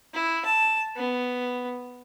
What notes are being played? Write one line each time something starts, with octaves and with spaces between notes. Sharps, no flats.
E4
A5
B3